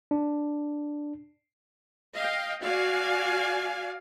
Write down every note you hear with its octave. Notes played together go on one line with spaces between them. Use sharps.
D4
D#5 F5 G5
F#4 D5 F5 G#5